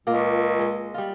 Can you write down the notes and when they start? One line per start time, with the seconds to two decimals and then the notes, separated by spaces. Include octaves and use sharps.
0.07 C#2 A#2 A#3 F4
0.59 G#3 D#5
0.94 G3 F4